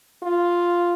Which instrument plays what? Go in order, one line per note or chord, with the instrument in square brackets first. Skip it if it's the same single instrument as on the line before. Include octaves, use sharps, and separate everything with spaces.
[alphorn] F4